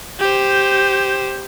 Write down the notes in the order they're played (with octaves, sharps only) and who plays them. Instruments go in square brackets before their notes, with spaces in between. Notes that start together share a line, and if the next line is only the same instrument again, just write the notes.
[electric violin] G4 C5